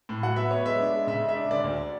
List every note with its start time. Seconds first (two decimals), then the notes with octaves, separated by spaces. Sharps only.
0.09 A2
0.23 F#3 F#5
0.36 B3 E5
0.51 B3 C#5
0.66 G#3 E5
0.79 D4
0.94 G#3
1.07 C#3 E5
1.22 G#3
1.29 E5
1.36 D4
1.51 D3 D5
1.64 D2